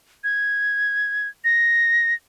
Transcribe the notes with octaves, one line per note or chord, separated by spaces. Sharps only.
G#6
A#6